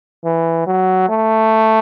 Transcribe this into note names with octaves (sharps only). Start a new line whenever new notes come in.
E3
F#3
A3